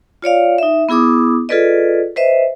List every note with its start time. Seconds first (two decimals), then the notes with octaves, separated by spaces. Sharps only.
0.22 F4 C#5 D5 F5
0.58 D#4 E5
0.89 B3 E4 G#4 D6 D#6
1.49 F4 G#4 A4 B4 D5 D#5
2.16 B4 C5 D#5 E5